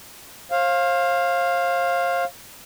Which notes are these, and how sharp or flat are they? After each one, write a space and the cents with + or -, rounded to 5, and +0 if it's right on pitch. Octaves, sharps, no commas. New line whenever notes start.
C5 +40 F5 +0